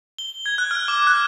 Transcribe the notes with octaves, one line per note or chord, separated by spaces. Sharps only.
G7
G#6
F#6
F6
D6
F#6